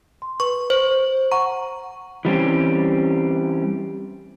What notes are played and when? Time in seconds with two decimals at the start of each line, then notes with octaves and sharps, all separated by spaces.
0.22 C6
0.40 B4 C#6
0.70 C5 F#7
1.32 F#5 A#5 C#6
2.25 E3 G3 C4 C#4